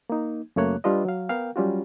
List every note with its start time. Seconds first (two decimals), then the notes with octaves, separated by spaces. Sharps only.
0.10 A#3 D#4
0.56 F#2 C#3 A3 A#3 C#5 F#6
0.84 G3 D4 F4 B4 D#5
1.05 F#3 F5
1.29 B3 A#4 F5 G5
1.56 F#3 G3 C#4 F4 F#4